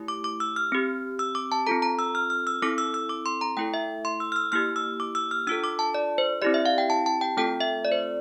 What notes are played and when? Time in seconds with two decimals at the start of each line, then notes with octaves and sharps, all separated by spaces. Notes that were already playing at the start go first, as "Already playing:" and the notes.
Already playing: A3 E4 G4
0.08 D6
0.24 D6
0.40 E6
0.56 F6
0.72 C4 G4
1.19 E6
1.35 D6
1.52 A5
1.67 C4 F4 A4 A#5
1.82 A#5
1.99 E6
2.15 F6
2.30 F6
2.47 E6
2.62 C4 E4 A4 D6
2.78 E6
2.94 E6
3.09 D6
3.26 C6
3.41 A#5
3.57 A3 E4 A4 G5
3.74 E5
4.05 C6
4.20 E6
4.32 F6
4.36 E6
4.52 A#3 E4 G4 F6
4.76 E6
5.00 D6
5.15 E6
5.31 F6
5.47 D4 F4 A4 E6
5.64 D6
5.79 A5
5.94 D5
6.18 C5
6.42 C4 E4 G4 D5
6.54 E5
6.66 F5
6.78 G5
6.90 A5
7.06 A5
7.21 G5
7.37 A3 C4 F4 A4 G5
7.61 E5
7.85 D5
7.92 C5